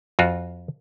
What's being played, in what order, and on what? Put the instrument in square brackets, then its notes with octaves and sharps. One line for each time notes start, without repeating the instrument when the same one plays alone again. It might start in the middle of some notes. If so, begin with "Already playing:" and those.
[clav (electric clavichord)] F2 F4 F#4